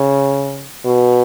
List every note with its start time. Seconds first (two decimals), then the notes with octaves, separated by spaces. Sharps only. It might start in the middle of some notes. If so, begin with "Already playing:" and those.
Already playing: C#3
0.85 B2